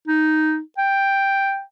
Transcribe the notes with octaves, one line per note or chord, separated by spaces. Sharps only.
D#4
G5